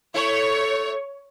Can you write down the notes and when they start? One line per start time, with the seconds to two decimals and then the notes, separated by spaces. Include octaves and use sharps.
0.14 A3 E4 C#5